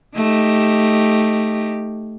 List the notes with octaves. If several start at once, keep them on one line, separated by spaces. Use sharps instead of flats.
A3 D#4 G4